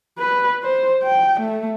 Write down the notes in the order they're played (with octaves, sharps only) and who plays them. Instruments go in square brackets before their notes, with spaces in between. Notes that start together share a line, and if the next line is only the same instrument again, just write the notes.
[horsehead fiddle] B4
C5
G5
A3